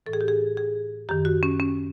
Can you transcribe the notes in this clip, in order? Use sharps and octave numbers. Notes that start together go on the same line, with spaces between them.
A2 E3 A4
G#4
G4
G#4
G#4
F#2 D#3 G4
F#4
C#4
C#4